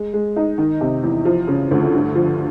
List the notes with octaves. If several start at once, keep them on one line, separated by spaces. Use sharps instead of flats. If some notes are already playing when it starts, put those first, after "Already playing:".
Already playing: G#3
G#3
D#4
D#3
C3
E2
F3
C#3
D2
G2
F3